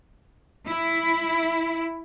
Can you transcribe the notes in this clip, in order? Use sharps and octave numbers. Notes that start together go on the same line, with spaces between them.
E4